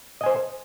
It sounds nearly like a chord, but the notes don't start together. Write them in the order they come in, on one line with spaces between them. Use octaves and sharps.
D#5 G#5 C5